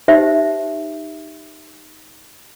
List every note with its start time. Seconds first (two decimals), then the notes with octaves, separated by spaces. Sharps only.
0.08 D#4 G4 C5 E5